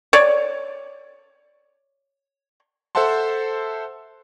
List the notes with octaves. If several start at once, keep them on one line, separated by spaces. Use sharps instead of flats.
C#5 D5
A4 C5 E5 F#5 A5 C6